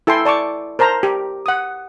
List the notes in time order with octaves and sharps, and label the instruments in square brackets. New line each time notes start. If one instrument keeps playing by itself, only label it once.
[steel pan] E4 A4 G5 G#5 C6
D5 A5 C#6 D6
A#4 C5 A5 A#5
G4
F#5 D#6